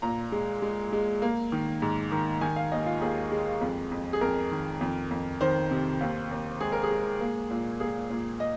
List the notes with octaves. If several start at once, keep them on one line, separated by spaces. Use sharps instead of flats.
A#2 A#5
G#3
G#3
G#3
A#3
D#3
G#2
D#3
D#3 G#5
F5
D#2 D#5
F4
D#2 G#4
G#3
F2
F2
G#4
F2 A#4
D#3
F2
F2
D#3 C5
C3
D#2
D#2
G#3 G#4
A#4
G#4
G#3
A#3
A#2
A#3 G#4
A#2
D#5